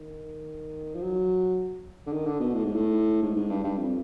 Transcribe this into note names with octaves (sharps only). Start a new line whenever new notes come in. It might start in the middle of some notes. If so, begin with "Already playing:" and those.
Already playing: D#3
F3
F#3
D3
D#3
D3
B2
A2
G#2
A2
G#2
G#2
G2
G2
F2